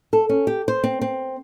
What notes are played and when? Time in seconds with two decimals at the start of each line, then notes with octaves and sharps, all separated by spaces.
0.13 A4
0.29 C#4
0.47 G4
0.68 C5
0.84 C4
1.01 C4